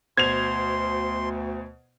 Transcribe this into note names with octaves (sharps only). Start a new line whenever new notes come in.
D2 B2 C5 C6 G#6 F7